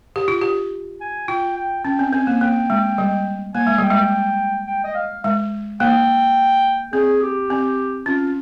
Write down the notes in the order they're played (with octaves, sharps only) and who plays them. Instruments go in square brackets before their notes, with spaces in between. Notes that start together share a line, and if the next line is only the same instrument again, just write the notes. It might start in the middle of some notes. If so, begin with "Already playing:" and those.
[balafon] G4
F4
G4
[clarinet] G#5
[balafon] F4 [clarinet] G5
[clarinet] G5
[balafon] C#4 [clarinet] G5
[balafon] C4
[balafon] C4 [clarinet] G#5
[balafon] A#3
[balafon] A#3 [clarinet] G5
[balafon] G#3
G3
[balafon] A#3 [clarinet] G#5
[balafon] G#3
[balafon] G3 [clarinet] G5
[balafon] G#3
[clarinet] G5
D#5
F5
[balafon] G#3
[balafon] A#3 [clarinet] G5
[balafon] C4 [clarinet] G#4
[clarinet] G4
[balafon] C4
[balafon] C#4 [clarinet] F4